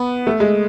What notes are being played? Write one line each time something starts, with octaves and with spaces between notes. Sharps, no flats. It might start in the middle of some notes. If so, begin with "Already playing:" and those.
Already playing: B3
A3
G#3